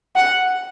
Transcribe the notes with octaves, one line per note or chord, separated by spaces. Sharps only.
F#5